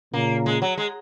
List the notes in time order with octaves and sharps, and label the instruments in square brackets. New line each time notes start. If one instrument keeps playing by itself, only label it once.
[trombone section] A#2 C#3 [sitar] A#3
[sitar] G#3
F#3
G#3